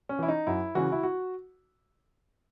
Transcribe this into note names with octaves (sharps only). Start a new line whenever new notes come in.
C#4
E3 E4
D#4
F#2 E4
C#3 E3 F#4
E4
F#4